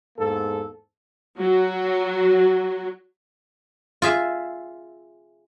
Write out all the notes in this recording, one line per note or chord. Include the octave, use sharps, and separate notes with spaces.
E2 G#2 A#3 A4
F#3 F#4
F4 G#4 E5